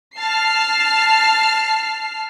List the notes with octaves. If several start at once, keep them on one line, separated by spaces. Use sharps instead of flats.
A5 F6 C7